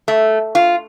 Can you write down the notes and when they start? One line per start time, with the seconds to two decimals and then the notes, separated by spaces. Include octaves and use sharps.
0.08 A3
0.55 F4